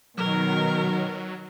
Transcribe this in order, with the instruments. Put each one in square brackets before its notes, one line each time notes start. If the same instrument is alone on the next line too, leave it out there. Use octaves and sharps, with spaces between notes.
[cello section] B2 D#3 [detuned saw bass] F#3 [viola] A#4